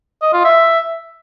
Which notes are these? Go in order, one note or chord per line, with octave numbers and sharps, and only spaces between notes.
D#5
F4
E5